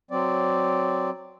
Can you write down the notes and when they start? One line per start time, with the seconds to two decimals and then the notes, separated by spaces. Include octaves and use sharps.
0.11 F#3 C4 D5